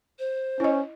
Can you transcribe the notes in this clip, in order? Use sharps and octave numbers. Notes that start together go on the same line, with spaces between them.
C5
C#4 E4 D#5